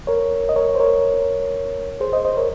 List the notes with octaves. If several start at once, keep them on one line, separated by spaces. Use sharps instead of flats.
A#4 C#5
D#5
A#4 C#5
C5
A#4 C#5
G#4 C5
C5 D#5
C5 D#5
A#4 C#5